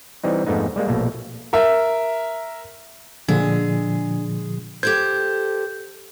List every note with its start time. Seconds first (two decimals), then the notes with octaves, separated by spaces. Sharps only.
0.24 E3 G3 C4 D#4
0.46 F2 G#2 A3 B3 D#4
0.76 G3 G#3 A#3
0.88 A#1 B2 A3 A#3
1.53 A#4 E5
3.28 A#2 D3 F3 G#3 D4 G#4
4.83 G4 A4 C5 G6 G#6